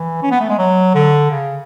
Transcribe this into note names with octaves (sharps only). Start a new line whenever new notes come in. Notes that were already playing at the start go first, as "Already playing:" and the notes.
Already playing: E3
C#4
B3
A3
G#3
F#3
D3
C#3